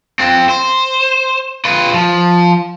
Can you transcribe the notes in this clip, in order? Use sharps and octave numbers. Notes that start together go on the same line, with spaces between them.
C4 F4
C5
F4 B4
F3